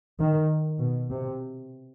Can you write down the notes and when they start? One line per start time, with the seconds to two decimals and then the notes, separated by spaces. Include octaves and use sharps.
0.20 D#3
0.81 B2
1.11 C3